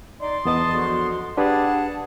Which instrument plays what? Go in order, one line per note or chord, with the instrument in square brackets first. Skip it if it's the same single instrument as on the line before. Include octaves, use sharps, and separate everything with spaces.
[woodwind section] D#4 D5 [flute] C6
[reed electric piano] E2 B3 D#5 [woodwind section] D#3 A5 D#6
[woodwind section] D3 F3 F#4
[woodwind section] G3 G#4 F#5 [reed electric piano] D4 G4 B4 [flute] A5